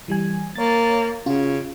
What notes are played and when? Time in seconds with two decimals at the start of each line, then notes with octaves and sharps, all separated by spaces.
0.08 E3 G3 G#5
0.55 A#3 C#5 A6
1.26 C#3 C#4 F4 F#4